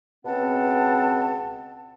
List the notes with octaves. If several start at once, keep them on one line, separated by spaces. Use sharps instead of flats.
C#2 B2 C4 F#5 A5